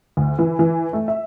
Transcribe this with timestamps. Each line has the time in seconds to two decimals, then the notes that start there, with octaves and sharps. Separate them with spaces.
0.17 D2
0.39 E3
0.59 E3
0.93 A3
1.08 E5